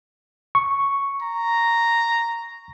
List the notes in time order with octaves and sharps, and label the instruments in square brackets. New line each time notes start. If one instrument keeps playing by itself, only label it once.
[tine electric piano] C#6
[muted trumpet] A#5